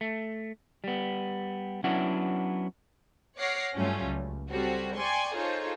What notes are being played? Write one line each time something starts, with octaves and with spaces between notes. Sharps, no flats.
A3
G3 B3
F#3 B3 C#4 D4 E4 F#5
C#5 F#5 D6 F6 A#6 C7
G2 F#3 G3 A3 C#4 F4
C#2
G3 C4 F#4 A4 C#5
D5 G5 G#5 C6 C#6
D#4 F4 G#4 A4 C5 C#5